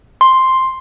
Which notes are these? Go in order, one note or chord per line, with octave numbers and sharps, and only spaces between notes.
C6